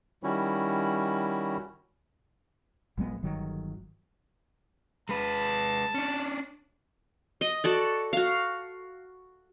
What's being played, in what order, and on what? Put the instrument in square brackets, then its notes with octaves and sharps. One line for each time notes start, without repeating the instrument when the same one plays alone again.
[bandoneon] D#3 G3 C#4 E4 F#4
[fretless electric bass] A#1 F#3 G#3 B3
G1 D#3 F#3
[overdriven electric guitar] G#3 B4 [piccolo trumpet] A5
[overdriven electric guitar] C#4 D4
[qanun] D#5
F#4 A4 D5
F#4 F5